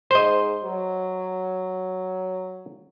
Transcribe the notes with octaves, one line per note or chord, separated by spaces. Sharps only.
G#2 C5 D#5
F#3